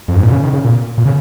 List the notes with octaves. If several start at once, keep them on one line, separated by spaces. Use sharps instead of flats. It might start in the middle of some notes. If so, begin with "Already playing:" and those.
F2
G#2
A#2
C#3
D#3
C#3
A#2
A#2
C#3